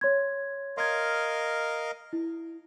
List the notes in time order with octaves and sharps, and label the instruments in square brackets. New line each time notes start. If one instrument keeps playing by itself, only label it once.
[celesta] C#5 C6 G#6
[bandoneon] A#4 D#5 F5 [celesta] C6 G#6
[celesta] E4